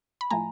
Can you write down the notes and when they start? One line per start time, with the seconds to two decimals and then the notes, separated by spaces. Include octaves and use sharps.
0.21 B5
0.30 A2 F3 A3 G#5 A#5